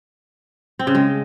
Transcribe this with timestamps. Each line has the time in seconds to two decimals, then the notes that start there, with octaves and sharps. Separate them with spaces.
0.79 C4
0.87 C#3
0.95 G#3